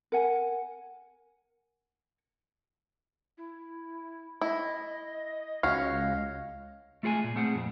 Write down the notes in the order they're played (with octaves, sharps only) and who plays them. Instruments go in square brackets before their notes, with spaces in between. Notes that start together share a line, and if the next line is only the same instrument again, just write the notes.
[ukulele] A#4 F#5 G#5
[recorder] E4
[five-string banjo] E4 [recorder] D#5
[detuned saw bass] C#2 [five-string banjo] C#4 F#4 [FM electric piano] F5
[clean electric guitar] A3 F4 G#4 F#5 G#5
A#2
A3 C4 G#4 F#5
F2 A#2